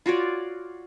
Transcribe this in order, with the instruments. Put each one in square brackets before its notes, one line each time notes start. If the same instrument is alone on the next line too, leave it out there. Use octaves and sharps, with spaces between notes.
[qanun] F4 F#4 C#5 D5